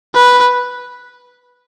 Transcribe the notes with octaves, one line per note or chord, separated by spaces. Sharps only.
B4